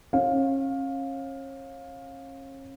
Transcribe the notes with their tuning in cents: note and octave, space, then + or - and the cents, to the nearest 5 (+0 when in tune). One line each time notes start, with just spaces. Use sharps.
C#4 -35 F5 +15